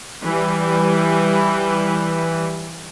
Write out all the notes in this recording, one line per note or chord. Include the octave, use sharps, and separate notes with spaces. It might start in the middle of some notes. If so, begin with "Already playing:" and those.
E3 G3